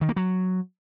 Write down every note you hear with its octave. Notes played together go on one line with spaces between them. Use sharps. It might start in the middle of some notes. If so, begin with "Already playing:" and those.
D#3
A#3
F#3